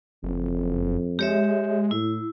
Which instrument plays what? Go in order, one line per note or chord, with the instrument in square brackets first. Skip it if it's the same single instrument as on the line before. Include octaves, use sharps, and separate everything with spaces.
[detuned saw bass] F#1 [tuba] F2
[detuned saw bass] G#3 [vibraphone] G4 C#5 E5
[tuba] A2 [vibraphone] E4